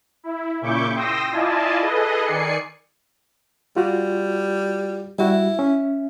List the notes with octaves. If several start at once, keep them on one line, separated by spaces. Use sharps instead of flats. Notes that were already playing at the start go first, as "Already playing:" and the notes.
E4
A#2 C#3 E4 C#6 D6 G6
G5 C6 D#6 E6 A#6
E4 F4 D5 D#5 G#5 A5
G#4 A4 B4 D#5
D#3 D5 G#5 C7 C#7
G3 F4 F#4
G3 E4 F#4
C#4 E5